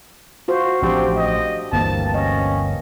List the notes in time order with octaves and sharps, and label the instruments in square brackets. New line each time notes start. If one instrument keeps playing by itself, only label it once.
[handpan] F4 F#4 C5
[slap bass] A1 F3 A3 [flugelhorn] C4 [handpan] D4 G4
[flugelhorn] D#5
[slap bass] G1 D2 [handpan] E3 A#3 C4 [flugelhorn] A5
[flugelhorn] C#4 [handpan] D#5